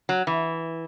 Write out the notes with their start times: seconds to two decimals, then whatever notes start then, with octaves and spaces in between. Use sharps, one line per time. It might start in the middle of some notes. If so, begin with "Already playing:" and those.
0.09 F#3
0.27 E3